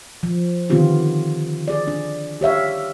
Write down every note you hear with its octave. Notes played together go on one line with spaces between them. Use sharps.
F3
D3 D#3 B3 C4 F4 G4
G#4 D5
D4
G4 C#5 E5 F5